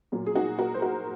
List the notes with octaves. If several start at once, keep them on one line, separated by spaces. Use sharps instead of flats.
A#2 F#3 A#3
G#4
D#4 F#4
F#4 A#4
C5
F#4 A#4